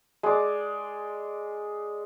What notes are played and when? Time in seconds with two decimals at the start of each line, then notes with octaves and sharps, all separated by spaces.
0.23 G#3 D5